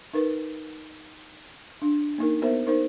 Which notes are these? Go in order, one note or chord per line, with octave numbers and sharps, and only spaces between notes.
D#4 A#4 B4
D4
A#3 D#4 A#4
B3 F#4 A#4 C5 E5
D#4 A#4 C5